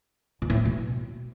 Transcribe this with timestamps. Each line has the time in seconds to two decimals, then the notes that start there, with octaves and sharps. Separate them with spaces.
0.42 A#2
0.50 A2
0.58 A3
0.65 B2